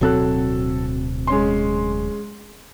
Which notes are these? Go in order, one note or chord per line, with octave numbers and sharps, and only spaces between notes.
D1 B2 F#3 C4 A4 F#6
G#3 C#4 C6